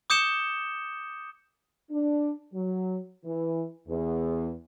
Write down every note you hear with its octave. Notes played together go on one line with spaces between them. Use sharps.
D6 D#6 G6 C#7 E7 G7
D4
F#3
E3
E2